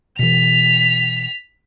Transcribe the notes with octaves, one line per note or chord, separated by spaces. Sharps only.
B2 E3 B6 F7